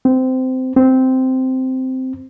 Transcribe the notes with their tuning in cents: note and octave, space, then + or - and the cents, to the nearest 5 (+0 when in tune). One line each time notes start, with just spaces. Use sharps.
C4 -20
C4 -10